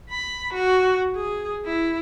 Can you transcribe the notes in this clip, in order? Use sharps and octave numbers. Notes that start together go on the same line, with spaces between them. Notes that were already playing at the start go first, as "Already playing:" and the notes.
B5
F#4
G#4
E4